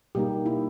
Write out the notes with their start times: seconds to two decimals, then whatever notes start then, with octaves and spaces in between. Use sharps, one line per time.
0.15 B2 G3 A#3 D#4 G4
0.46 E4